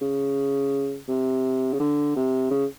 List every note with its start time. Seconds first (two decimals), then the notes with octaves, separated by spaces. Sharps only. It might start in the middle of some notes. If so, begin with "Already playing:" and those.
0.02 C#3
1.08 C3
1.73 C#3
1.80 D3
2.16 C3
2.51 C#3